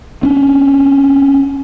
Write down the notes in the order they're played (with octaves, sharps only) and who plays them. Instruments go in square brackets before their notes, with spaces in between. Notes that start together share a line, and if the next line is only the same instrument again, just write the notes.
[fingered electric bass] C#4 D4